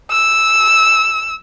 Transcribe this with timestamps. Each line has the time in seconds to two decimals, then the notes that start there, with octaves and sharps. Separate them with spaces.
0.11 E6